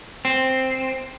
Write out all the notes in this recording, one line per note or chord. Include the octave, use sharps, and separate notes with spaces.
C4